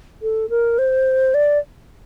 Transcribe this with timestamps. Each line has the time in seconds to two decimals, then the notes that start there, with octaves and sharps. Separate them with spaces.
0.22 A4
0.50 A#4
0.78 C5
1.34 D5